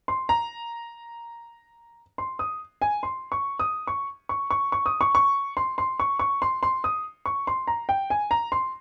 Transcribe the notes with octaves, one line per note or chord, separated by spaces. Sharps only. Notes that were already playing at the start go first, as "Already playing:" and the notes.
C6
A#5
C6
D#6
G#5
C6
C#6
D#6
C#6
C#6
C#6
C#6
D#6
C#6
C#6
C6
C6
C#6
C#6
C6
C6
D#6
C#6
C6
A#5
G5
G#5
A#5
C6